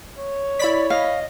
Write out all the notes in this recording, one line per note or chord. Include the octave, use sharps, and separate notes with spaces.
C#5
E4 D5 B5 B6
D#5 F5